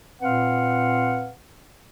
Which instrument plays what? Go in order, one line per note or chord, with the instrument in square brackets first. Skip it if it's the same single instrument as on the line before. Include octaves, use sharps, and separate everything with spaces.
[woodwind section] A#2 C4 B4 F5 F#5